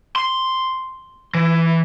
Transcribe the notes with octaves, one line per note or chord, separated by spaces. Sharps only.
C6
E3